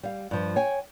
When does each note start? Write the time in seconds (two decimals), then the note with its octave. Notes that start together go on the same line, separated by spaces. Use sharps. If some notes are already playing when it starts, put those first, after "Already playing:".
0.03 G3 F5
0.31 G2 F3
0.56 C#5 G5 G#5